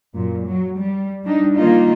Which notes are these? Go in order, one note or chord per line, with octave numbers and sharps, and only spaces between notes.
F#2 A#2
F#3
G3
G3 D4 D#4
D#3 G3 A#3 D#4 F4